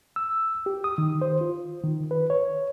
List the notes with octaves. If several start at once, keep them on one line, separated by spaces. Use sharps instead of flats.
E6
G4
D#6
D#3
C5
F4
D#3
B4
C#5